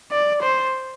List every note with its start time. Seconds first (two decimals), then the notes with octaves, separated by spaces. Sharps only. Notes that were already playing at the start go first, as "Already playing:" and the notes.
0.11 D5
0.43 C5